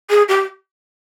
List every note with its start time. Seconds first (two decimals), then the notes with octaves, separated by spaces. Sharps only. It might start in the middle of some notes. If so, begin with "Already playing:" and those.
0.10 G#4
0.29 G4